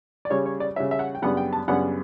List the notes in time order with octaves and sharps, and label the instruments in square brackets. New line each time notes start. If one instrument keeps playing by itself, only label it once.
[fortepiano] D5
C#3 G3 C#4 C#5
C#5
D5
C#3 G3 C#4 E5
E5
F#5
G5
F#2 C#3 G3 B3 D4 F#5
G5
A5
F#2 C#3 G3 B3 D4 F#5